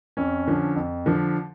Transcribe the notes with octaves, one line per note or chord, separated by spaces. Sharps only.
F2 C#4
D3 F3
F2
D3 F3